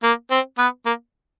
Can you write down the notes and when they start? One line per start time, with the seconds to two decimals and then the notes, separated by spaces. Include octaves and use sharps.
0.03 A#3
0.31 C4
0.58 B3
0.86 A#3